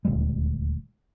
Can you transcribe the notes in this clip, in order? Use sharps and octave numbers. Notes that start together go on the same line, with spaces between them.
D#1 D2 G3 G#3